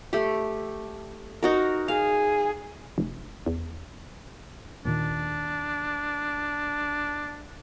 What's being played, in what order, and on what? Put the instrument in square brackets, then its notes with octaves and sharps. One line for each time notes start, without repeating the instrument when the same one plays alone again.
[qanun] A3 G4
D#4 F#4 A#4
[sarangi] G#4 [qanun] F5
[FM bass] F1
E2
[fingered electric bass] D#2 A#2 D#3 [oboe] D4